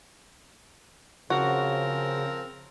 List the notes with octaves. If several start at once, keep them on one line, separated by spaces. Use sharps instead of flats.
C#3 F3 C4 F#4 A#4